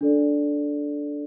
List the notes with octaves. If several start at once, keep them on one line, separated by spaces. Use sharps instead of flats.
D4 A4 D5